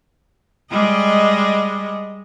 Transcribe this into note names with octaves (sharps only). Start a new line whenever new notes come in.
G3 G#3 D#5